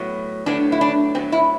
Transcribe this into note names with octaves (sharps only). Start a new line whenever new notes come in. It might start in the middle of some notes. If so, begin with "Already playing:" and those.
Already playing: A2 F#3 B3
A2 F#3 B3 D4
E4
D4
A2 F#3 B3 C4
E4